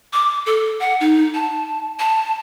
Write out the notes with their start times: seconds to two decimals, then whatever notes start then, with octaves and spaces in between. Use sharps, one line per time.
0.13 D6
0.46 A4
0.80 F#5
1.01 D#4
1.35 A5
1.99 A5